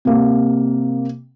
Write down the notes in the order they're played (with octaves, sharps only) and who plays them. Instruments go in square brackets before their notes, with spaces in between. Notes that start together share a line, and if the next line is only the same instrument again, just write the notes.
[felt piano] C3 A#3